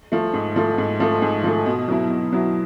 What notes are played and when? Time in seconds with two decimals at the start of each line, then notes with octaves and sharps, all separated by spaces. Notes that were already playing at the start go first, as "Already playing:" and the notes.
0.12 F3 A3
0.33 G#2
0.56 F3 A3
0.78 G#2
1.00 F3 A3
1.22 G#2
1.44 F3 A3
1.66 B2
1.88 F#3 B3 E4
2.10 B2
2.32 F#3 B3 E4